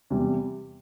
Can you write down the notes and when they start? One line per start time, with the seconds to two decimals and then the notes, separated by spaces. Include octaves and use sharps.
0.10 E2 C3 G3